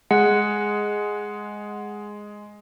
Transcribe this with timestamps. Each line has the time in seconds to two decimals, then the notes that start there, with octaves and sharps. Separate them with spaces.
0.11 G#3 F#5